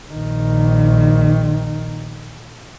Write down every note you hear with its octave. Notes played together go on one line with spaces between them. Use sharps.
A#1 D#3